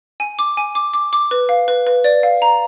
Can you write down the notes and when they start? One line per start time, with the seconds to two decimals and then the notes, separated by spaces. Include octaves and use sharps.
0.20 G#5
0.39 D6
0.57 G#5
0.75 D6
0.94 D6
1.13 D6
1.31 B4
1.49 F5
1.68 B4
1.87 B4
2.04 D5
2.23 F5
2.42 A#5